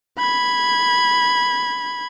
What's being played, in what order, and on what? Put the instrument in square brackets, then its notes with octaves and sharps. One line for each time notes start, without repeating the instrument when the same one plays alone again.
[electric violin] B5 G#6